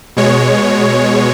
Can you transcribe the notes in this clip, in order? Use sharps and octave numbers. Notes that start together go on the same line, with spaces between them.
B2 G#3 C#5